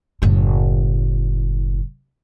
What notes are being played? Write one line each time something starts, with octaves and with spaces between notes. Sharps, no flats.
F#1 A2